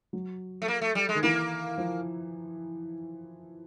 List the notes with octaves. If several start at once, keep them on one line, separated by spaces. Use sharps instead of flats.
F#3
A3
A#3
A3
G3
G#3
D#3
E3 A#3
F3